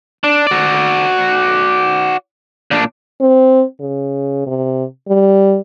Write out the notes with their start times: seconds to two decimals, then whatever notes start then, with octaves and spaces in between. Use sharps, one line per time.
0.24 D4
0.47 F#4 D5
2.71 A#2 D4
3.21 C4
3.80 C#3
4.47 C3
5.08 G3